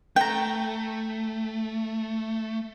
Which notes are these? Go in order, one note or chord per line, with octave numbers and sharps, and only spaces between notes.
A3 G5 A#5